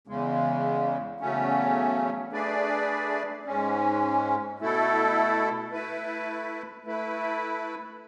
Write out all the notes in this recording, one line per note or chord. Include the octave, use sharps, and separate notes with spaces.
E2 C#3 G#3
E2 C#3 F#3 A3 C#4
A3 D4 G#4 B4 D5
G#2 G#3 C#4
B2 A3 E4 A4
A3 E4 B4
A3 E4 B4